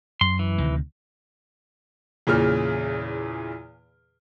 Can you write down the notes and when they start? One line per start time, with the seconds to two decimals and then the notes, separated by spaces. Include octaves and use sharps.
0.21 F#2 C6
0.39 E3
0.58 D2 C3 D#3
2.27 E2 A#2 C#3 F6